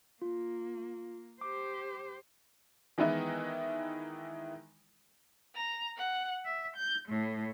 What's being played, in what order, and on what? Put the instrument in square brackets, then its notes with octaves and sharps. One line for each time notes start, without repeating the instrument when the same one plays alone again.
[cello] A#3 [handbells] F4
[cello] G4 C5 [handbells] D6
[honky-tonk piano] D#3 E3 G#3 B3 D#4 E4
[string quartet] A#5
F#5
E5
G6
A2